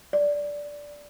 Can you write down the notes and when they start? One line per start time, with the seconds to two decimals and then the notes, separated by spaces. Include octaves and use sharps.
0.13 D5